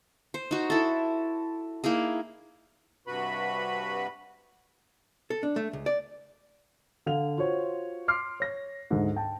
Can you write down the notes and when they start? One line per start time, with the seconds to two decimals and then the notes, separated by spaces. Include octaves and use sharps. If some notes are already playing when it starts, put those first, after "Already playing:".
0.34 C5
0.51 D#4 F#4
0.70 E4 A4
1.84 A#3 D#4 E4 G#4
3.07 G2 C3 F#4 B4 B5
5.30 A4
5.43 D4
5.56 A3
5.73 C#2
5.86 D5
7.06 D3 F5 F7
7.38 F4 F#4 C5 C#5
8.08 C6 D6 F6 C7
8.40 C#5 A#6
8.91 D2 G#2
9.16 G5 A5